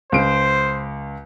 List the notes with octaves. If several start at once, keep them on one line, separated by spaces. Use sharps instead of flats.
C#2 C5 D7